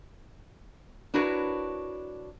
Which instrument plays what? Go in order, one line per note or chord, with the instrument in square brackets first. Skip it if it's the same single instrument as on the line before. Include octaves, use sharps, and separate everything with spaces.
[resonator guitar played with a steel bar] D4 E4 F#4 A#4 B4 C#5